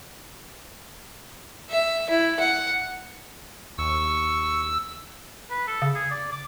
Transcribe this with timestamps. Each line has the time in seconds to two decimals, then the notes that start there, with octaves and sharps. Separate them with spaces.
1.70 E5
2.10 E4
2.40 F#5
3.78 D#2 C#6 E6
5.50 B4
5.67 A4
5.82 C#3
5.95 G#4
6.11 D5
6.32 D6